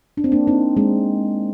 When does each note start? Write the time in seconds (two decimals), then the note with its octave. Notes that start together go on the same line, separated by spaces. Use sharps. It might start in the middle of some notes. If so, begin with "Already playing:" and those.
0.17 D4
0.24 C4
0.32 A#3 D4
0.47 C4 D#4
0.77 G#3 C4